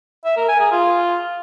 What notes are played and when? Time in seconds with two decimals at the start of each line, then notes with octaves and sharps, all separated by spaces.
0.25 E5
0.37 A#4
0.48 G#5
0.60 G#4
0.72 F4